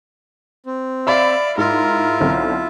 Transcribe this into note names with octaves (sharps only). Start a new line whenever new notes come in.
C4
D5 E5 F5 B5
G#2 E4 F4 A#4
B1 D3 C4